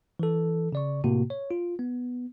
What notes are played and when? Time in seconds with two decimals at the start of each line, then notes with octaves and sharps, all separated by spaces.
0.20 E3 A4
0.73 C#3 D5 C#6
1.04 A2 C3 A#3 F#4
1.30 C#5
1.51 F4
1.79 B3